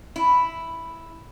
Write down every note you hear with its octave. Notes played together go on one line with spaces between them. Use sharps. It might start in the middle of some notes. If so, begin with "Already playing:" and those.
E4